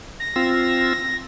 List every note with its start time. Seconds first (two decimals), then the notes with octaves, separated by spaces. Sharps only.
0.19 A#6
0.36 C4 F4 E6